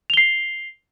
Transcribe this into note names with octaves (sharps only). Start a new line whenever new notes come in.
C7 F7 G7